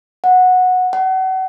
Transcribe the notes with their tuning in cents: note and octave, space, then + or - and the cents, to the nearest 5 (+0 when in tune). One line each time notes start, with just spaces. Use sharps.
F#5 -10
F#5 +35